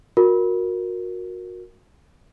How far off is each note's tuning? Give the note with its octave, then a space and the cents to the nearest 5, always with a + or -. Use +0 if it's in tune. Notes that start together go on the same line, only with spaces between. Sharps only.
F#4 -25 A#4 +0